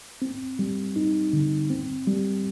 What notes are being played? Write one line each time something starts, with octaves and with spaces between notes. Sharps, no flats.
C4
G3
D#4
D3
C4
G3